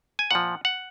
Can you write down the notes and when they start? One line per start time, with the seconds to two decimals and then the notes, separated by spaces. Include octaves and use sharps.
0.19 G#5
0.31 A#2 F3 F#5
0.65 F#5